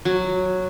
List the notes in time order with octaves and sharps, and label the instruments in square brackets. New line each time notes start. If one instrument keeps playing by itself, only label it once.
[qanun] F#3